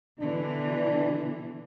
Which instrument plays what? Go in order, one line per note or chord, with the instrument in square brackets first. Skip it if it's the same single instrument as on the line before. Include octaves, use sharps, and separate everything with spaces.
[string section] B2 D3 E3 [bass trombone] D4